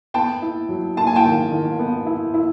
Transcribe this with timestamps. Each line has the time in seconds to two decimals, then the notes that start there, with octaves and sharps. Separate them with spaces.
0.14 B3 G5 A5
0.42 E4
0.69 F#3
0.96 E4 A5
1.07 G#5
1.16 G5 A5
1.25 D#3
1.51 D#3
1.79 B3
2.06 E4
2.34 E4